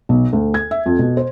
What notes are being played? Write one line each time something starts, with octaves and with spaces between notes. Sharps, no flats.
B1
D2
G#6
E5
F2
B2
C5